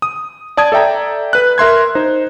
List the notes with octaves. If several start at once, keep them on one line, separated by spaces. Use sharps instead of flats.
D#6
D5 A5 D#6 G#6
A4 D5 E5 G5 A#5
B4 F#6
A#4 E5 C6 G#6
D#4 C5